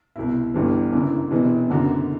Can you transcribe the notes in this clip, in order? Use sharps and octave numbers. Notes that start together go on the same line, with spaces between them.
C2 B2 E4
G1 G2 E3
F#1 F#2 D3 E4
E1 E2 C3 E3
F#1 F#2 D3 F#4